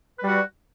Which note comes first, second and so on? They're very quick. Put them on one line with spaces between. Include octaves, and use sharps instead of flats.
B4 G3 F#4